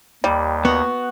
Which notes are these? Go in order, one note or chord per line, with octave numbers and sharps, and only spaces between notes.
D#2 G3
B3 F#4